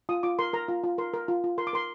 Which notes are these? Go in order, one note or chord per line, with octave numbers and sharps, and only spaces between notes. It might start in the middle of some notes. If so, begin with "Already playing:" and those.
F4 D#6
F4 D6
A#4 C6
A#4 A#5
F4
F4
A#4 C6
A#4
F4
F4
A#4 C6
D6
A#4 C6